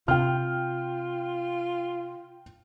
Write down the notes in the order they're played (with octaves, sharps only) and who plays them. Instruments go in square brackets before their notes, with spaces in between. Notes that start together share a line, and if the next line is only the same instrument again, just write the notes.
[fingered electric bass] C3 [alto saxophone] F4 [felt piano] G5 F6